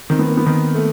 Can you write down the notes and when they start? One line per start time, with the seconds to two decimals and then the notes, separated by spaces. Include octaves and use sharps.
0.10 D#3 C4
0.19 B3
0.28 A#3
0.37 B3
0.46 D#3
0.75 A3